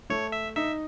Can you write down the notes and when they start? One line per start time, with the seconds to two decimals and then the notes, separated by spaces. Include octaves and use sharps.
0.10 A3 C#5
0.32 E5
0.56 D#4 E5